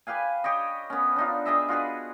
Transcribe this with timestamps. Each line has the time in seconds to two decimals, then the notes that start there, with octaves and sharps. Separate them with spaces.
0.07 G4 B4 F5 G#5
0.44 G4 C#5 D#5
0.90 B3 C#4
1.16 D4 D#4 F4
1.45 D4 G#4 D#5 E5
1.69 F4 F#4 G#4 B4